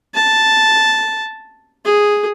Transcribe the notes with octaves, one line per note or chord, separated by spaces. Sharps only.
A5
G#4